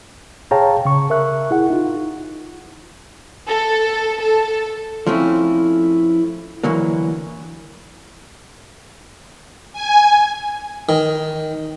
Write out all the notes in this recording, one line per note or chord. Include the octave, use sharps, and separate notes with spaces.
G#4 C#5 F5 G5 A5 A#5
C#3 C#6
A#4 E5 C#6 F#6
E4 G#4 F#5
D#4 F4
A4
A4
F3 A3 C4 C#4 E4
D2 E3 F#3 A#3
G#5
D#3